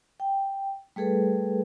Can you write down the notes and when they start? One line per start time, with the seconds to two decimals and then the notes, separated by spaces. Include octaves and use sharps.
0.20 G5
0.96 G3 A3 G#4 A4 B4